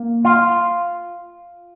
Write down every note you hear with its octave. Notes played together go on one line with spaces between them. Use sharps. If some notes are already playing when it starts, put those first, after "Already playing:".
Already playing: A#3
F4